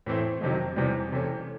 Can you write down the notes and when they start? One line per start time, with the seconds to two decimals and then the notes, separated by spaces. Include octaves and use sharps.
0.06 A2 E3 A3 C4 E4
0.41 F2 C3 D#3 F#3
0.76 E2 C3 E3 G3
1.12 C3 E3 A3 C#4